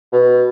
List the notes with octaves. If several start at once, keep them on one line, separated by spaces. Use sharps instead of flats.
B2